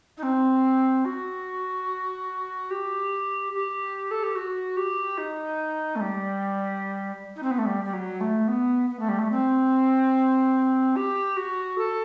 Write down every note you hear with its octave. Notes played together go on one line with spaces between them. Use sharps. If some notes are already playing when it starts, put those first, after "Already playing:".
D#4
C4
F#4
G4
G4
A4
G4
F#4
G4
D#4
A3
G3
D#4
C4
B3
A3
G3
G3
F#3
A3
B3
B3
A3
G3
A3
C4
G4
F#4
A4